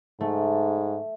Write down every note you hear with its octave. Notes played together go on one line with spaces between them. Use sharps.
G#2 A3